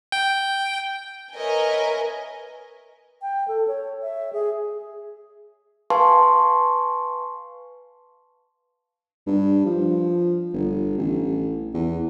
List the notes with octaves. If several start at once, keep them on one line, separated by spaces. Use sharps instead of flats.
G5
A#4 B4 C#5 D#5 E5 G#5
G5
A4
C#5
E5
G#4
B4 F5 G#5 A5 C6 C#6
G2
F3
G1
A1
E2